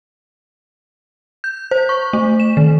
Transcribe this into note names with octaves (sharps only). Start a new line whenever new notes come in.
G6
C5
C#6
A3
E7
D#3